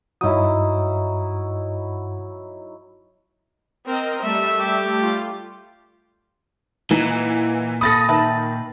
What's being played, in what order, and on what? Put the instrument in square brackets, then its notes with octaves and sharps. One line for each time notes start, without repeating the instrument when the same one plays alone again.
[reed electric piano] G2 D#6 [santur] F#3 D#4 E4
[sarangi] C4 [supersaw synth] A#4 D#5
[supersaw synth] G3 A3 [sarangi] E5
[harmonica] G4
[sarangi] F4
[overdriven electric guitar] A#2 [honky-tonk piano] E3 [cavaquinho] D#4 F#5 A#5
[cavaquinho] A4 F5 B5 [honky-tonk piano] D#6 A6 A#6
[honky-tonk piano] D#3 [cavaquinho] B4 E5 A5